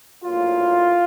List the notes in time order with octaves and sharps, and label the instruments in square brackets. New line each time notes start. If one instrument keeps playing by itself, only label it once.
[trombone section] A#1 A2 F#3 A#3 F4